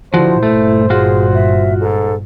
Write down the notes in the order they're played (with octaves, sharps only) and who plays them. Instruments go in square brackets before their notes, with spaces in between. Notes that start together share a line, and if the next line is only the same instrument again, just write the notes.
[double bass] D3 [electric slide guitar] F3 F#4 [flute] E4 [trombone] C5
[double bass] G1 A#2 [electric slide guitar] A3
[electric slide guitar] F4 F#4 [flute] G#4
[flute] E5
[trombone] G#2 [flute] A4